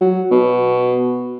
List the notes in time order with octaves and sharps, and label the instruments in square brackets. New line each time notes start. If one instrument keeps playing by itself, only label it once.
[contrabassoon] F#3
B2